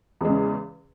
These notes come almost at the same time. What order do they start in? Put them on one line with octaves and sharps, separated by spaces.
E2 G#3 C#3